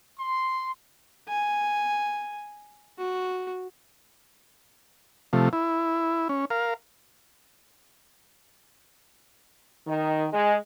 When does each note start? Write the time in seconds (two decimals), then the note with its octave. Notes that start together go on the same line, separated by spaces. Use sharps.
0.19 C6
1.29 G#5
2.98 F#4
5.33 C3 F3 A3
5.53 E4
6.29 C#4
6.50 A#4 F5
9.87 D#3
10.31 G#3